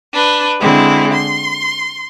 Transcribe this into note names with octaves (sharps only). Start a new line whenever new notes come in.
D4 B4
D3 G#3 C4 E4
C6